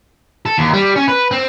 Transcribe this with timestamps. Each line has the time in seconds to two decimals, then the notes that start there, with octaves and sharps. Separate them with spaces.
0.46 A4
0.58 D#2
0.73 G3
0.96 C#4
1.08 B4
1.31 C4